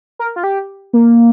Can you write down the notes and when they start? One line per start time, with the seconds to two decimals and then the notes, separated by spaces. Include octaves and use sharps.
0.19 A#4
0.36 F4
0.44 G4
0.93 A#3